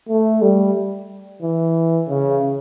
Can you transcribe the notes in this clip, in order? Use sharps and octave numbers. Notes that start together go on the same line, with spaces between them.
A3
G3
E3
C#3